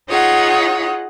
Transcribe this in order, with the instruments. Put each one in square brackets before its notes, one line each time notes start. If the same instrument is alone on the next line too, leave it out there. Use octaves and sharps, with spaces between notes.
[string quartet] D#4 F4 G#4 C#5 F#5